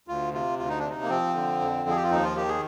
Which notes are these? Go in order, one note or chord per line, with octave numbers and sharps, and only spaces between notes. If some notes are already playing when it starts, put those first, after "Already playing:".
D2 F4
C3 F4
D2 F4
D#4
C3 D4
D#4
A#3
F3 C4
D3
F2
F3 G#4
G4
F4
D#2 D#4
F4
D#3 G4
G#4